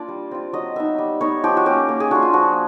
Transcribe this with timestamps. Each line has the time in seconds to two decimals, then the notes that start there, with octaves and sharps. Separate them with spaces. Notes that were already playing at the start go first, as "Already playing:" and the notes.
Already playing: A#3 D4 F4 D5
0.08 G3
0.31 C4 F4
0.53 F#3 D#5
0.76 B3 D#4 E5
0.98 G3
1.21 B3 D#4 C#5
1.44 F3 G4
1.57 F#4
1.66 A#3 C#4 G4
1.89 A#3
2.00 G#4
2.11 D4 F4 F#4
2.22 F4
2.33 F3 F#4